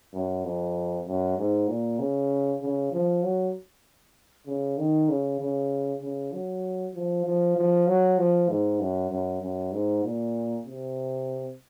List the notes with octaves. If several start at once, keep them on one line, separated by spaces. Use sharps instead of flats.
F#2
F2
F#2
G#2
A#2
C#3
C#3
F3
F#3
C#3
D#3
C#3
C#3
C#3
F#3
F3
F3
F3
F#3
F3
G#2
F#2
F#2
F#2
G#2
A#2
C3